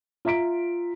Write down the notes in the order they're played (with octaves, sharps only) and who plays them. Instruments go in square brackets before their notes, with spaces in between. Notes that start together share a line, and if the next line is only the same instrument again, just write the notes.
[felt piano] F4 E5 A#5 B6 D7